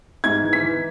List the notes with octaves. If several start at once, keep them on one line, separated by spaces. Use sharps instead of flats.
G#2 G#6
E3
B6
E3